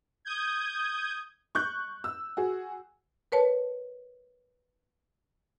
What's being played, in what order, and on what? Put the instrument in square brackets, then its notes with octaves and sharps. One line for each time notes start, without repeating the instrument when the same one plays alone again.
[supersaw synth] D#6 G6 G#6
[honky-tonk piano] C#6 F#6 G6
E6
F#4 G#4
[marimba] A#4 B4 C#5 A5